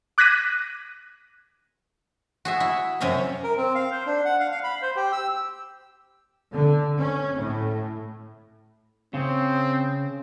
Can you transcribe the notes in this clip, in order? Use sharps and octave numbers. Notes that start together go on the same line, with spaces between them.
D6 F#6 G#6 A#6 B6 D#7
F#4 G#4 E5
E4
F#2 C3 C#4 E5 A#5
A#4
C4
F5
C5
D4
F#5
F5
F5
B5
C5
G4
E6
D3
C#4
A2
C#3 C4